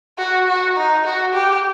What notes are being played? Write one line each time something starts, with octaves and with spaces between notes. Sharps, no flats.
F#4
F#4
D#4
F#4
G4